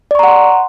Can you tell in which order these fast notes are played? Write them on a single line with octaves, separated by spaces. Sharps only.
D5 C#6 A#5 F#5 C6